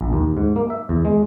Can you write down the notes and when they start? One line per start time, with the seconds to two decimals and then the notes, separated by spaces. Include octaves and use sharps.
0.01 A#1
0.13 D#2
0.37 G#2
0.56 A#3
0.70 E5
0.89 E2
1.05 G#3